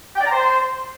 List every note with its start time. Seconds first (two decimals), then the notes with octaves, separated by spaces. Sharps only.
0.16 G5
0.21 D5
0.26 A#5
0.31 C5